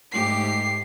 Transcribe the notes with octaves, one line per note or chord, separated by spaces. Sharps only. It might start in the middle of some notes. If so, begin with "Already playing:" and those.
G#2 A3 G4 C7